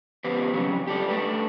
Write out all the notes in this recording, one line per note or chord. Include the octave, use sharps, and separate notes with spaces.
F3 B3 G4 B4 C5
F2 C#3 F#3
G4 A4 D5
A3 D4 A4 B4